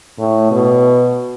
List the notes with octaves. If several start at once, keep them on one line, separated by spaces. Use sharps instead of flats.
A2
B2